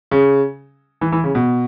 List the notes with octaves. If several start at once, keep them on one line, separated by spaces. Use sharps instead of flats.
C#3
E3
E3
C#3
B2